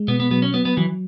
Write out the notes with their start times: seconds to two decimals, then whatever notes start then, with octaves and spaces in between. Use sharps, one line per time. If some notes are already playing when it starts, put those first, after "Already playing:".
Already playing: G#3
0.08 B2 B3
0.20 B3
0.31 F#3 B3
0.42 C#4
0.54 F#3 B3
0.65 B3
0.77 E3 F#3